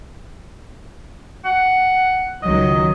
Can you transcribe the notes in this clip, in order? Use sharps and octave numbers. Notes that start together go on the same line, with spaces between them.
F#5
C#2 D#3 F#3 D#5